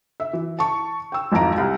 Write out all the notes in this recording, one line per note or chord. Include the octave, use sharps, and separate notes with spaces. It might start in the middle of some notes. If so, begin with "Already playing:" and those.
E5
E3
A5 C#6
G5 E6
G#1 F2 E4 F5 A#5 D7
C2